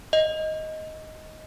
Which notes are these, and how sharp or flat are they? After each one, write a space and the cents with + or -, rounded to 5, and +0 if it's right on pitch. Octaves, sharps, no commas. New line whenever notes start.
D#5 +10